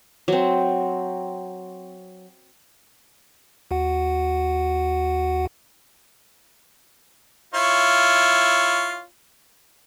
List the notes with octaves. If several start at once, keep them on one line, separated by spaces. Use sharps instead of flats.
F#3 C4
D#2 F#4 F#5
E4 F4 C#5